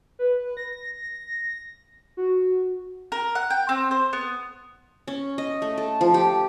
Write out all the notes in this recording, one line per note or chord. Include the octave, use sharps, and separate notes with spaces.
B4
A#6
F#4
A#4
F#5
G5
C4
C5
B3
C#4
D#5
A3
A4
F3
G4